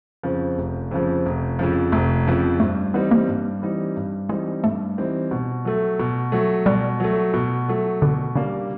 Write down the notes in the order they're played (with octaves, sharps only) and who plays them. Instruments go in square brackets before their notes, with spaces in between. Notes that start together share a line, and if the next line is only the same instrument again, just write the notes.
[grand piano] F2 C#3 F3
F1
F2 C#3 F3
F1
F2 C#3 F3
[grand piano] F1 [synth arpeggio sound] A3
[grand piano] F2 C#3 F3
[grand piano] G2 [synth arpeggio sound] A3
[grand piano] E3 G3 C4 D#4 [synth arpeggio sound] B3
[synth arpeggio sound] A#3
[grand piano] G2
E3 G3 C4 D#4
G2
[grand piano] E3 G3 C4 D#4 [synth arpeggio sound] G#3
[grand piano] G2 [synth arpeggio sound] A3
[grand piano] E3 G3 C4 D#4
B2
F#3 A3
B2
F#3 A3
[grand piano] B2 [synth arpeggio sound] G3
[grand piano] F#3 A3
B2
F#3 A3
[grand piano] B2 [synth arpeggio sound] D3
[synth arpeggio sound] C#3 [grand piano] G3 A#3 D4